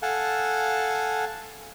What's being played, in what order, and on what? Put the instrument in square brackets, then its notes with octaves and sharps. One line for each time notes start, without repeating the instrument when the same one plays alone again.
[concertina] A4 F5 F#5 G#5 A5